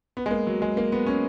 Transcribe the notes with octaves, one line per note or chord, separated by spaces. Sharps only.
B3
G#3
A#3
F#3
G#3
A#3
B3
C#4